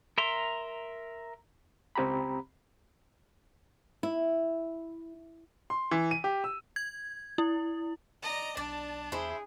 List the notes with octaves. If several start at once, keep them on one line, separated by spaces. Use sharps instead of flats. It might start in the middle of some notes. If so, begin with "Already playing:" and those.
A#4 E5 A#5 C6
C#2 C4 G4 A#5 B5
E4
C6
E3
D#7
G4
E6
G#6
E4
D5 D#5 A#5
B1 D4 D5 A5
E2 E4 G#4 C5